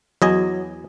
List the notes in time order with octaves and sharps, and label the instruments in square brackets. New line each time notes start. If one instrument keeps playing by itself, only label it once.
[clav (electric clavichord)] E2 D#5 G#5 [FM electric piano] F#3